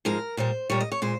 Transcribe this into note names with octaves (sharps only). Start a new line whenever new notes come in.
G#2 F3 G#3 A#4
A#2 G3 C5
A#2 G3 C#5
D#5
C#5
A#2 G#3 C5